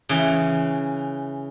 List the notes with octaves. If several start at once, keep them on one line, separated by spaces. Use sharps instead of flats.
C#3 E3